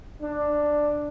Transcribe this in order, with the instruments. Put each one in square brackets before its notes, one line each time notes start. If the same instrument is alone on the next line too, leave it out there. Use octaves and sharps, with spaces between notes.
[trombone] D4